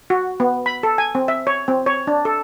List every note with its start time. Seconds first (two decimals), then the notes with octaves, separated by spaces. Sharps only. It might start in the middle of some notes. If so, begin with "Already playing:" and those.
0.10 F#4
0.40 B3
0.66 B5
0.83 A4
0.98 G#5
1.15 C4
1.28 E5
1.47 C#5
1.68 C4
1.86 C#5
2.07 D4
2.25 A4